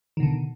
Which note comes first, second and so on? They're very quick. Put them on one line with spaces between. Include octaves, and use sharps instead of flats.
D#3 B2 D3